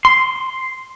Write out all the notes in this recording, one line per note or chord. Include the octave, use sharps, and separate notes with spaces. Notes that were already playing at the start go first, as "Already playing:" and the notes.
C6